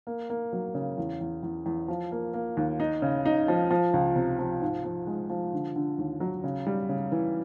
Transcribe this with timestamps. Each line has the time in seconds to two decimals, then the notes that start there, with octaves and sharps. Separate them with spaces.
0.07 A#3
0.30 A#3
0.53 F#3
0.75 C#3
0.98 E2
1.21 E2
1.43 E2
1.66 E2
1.88 F3
2.12 A#3
2.34 A#3
2.57 D#2
2.80 D#4
3.02 C#3
3.25 D#4
3.48 F3
3.71 F3
3.94 C#2
4.16 C3
4.39 F3
4.62 G#2
4.84 F3
5.07 G#3
5.29 F3
5.53 D3
5.76 D3
5.98 D#2
6.20 F#3
6.44 C#3
6.67 G3
6.89 C#3
7.12 E3